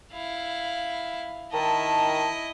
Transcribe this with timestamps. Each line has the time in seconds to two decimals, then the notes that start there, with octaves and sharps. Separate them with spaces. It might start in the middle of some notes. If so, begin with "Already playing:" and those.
0.12 E4 F5
1.52 D#3 E4 D#5 A5